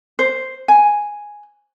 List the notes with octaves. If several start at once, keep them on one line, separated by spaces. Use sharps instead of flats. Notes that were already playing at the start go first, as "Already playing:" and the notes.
C5
G#5